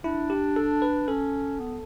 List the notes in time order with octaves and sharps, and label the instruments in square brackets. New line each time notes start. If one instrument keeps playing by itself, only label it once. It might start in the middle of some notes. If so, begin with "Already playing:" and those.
[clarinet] D4 [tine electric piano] E4
[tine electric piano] G4
A4
B4
[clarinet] C#4 [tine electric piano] A4
[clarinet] B3